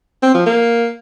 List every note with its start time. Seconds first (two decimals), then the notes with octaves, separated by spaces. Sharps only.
0.23 C4
0.34 F3
0.46 A#3